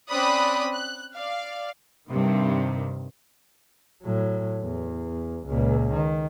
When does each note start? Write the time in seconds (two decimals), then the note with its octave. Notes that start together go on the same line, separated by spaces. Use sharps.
0.11 C4 C#4 D5 B5 D#6 F#6
0.72 F#6
1.15 D5 F5
2.09 G2 C3 D#3
4.03 A2 F#3
4.63 E2
5.48 C#2 A#2
5.93 D#3